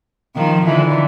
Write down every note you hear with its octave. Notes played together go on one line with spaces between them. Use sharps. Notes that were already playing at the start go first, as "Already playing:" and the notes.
D#3 F3
D3 E3